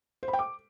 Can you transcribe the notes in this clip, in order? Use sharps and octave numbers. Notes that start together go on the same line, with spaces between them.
C5
B5
G5
D6